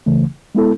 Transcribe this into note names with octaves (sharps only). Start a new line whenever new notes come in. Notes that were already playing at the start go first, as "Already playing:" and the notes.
C#2 C#3 E3 A3
G#3 B3 E4 A4